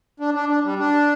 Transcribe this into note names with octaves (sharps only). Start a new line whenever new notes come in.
D4
D4
D4
G3
D4